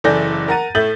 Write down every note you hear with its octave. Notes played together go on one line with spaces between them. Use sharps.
F#1 E3 A4 D5 G6 A#6
A#4 F#5 A#5 A6 D#7
A2 A3 E5 G6 A6 F#7